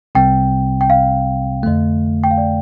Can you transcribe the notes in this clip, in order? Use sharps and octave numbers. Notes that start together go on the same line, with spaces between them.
C2 C3 G3 C4 G5
G5
F5
F2 D3 A3
G5
F5
D5